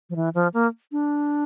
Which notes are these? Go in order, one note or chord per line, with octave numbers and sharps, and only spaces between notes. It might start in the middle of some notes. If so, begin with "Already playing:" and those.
F3
E3
F3
A#3
D4